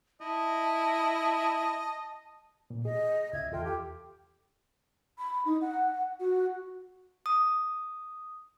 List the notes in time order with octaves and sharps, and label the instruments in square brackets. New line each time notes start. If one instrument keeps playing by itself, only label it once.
[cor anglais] E4 [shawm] D#5 [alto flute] A5
[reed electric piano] A#2
[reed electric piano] G#4 [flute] D#5
[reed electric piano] C#2 E5 [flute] G#6
[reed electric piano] E2 A4 G5 [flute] F4
[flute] G4
[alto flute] B5
D#4
F#5
F#4
[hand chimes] D#6